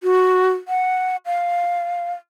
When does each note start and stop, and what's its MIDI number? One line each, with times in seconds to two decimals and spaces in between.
0.03 0.50 66
0.68 1.16 78
1.26 2.12 77